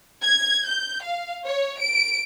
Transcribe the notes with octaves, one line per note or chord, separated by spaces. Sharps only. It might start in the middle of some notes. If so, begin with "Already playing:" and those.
G#6
G6
F5
C#5
D7